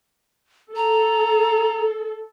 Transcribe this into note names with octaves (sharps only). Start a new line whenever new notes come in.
A4 A#5